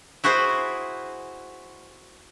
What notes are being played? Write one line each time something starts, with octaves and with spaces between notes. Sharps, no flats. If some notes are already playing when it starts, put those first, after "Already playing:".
E4 F#4 G#4 C5